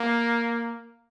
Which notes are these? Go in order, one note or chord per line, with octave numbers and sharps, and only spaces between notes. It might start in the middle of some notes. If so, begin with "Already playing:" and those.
Already playing: A#3